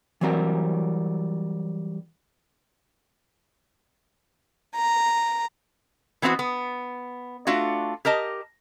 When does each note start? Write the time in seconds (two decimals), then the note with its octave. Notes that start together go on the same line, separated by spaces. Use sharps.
0.21 E3 F#3 G3 C4 F#4 A#4
4.76 A#5
6.22 E3 B3 C4 F4 F#4
6.39 B3
7.47 A3 D4 F4 F#4
8.05 G4 A#4 D#5 A5